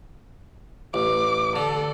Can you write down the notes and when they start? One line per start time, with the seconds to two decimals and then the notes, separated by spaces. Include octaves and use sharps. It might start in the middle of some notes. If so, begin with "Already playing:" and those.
0.94 A1 D6
1.56 D3 A4